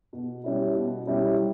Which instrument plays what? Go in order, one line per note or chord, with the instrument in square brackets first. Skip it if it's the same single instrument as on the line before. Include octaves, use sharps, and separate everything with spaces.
[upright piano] B2
G3 C#4 E4
B2
G3 C#4 E4
G3